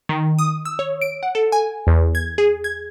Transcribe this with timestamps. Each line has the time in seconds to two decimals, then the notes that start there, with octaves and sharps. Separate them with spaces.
0.09 D#3
0.39 D#6
0.65 E6
0.79 C#5
1.01 D7
1.23 F#5
1.35 A4
1.52 G#5
1.87 E2
2.15 G#6
2.38 G#4
2.64 G#6